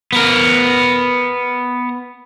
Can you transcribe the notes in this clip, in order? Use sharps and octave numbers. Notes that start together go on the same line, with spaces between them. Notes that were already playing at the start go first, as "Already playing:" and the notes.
B3 A#4